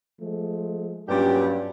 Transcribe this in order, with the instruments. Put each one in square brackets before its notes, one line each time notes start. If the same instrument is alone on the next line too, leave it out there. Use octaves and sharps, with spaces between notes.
[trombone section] F3 G#3 A3
[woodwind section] G2 [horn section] A#2 B3 G4 [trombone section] F#3 C#4